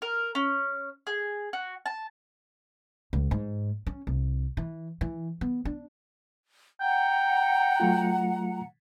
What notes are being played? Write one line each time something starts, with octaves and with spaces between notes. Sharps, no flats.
A#4
C#4
G#4
F#4
A5
C#2
G#2
C#4
C2
E3
E3
B3
D4
F#5 G5 A#5
F#3 A3 F4